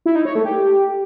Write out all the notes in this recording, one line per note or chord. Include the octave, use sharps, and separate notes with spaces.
E4
D#4
C#5
A3
G4